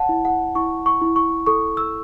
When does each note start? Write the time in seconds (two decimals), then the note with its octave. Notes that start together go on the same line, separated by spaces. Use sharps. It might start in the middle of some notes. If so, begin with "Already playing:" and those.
Already playing: C#5 F#5 A5
0.09 E4
0.25 F#5
0.55 E4 C#6
0.86 C#6
1.01 E4
1.16 C#6
1.46 A4 C#6
1.77 E6